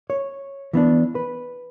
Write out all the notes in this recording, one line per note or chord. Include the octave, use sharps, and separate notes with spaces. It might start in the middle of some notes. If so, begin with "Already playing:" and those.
C#5
E3 B3 D4
B4